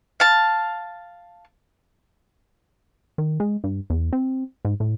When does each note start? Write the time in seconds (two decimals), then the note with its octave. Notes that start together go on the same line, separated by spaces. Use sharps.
0.20 F5 A5
3.18 D#3
3.40 G#3
3.64 G2
3.90 E2
4.13 C4
4.65 G#2
4.80 A2